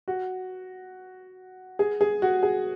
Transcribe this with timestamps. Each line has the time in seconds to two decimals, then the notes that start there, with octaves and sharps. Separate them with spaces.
0.08 F#4
1.79 G#4
2.01 G#4
2.22 F#4
2.43 G#4